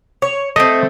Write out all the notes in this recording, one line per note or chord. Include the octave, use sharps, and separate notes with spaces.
C#5
A3 C4 D#5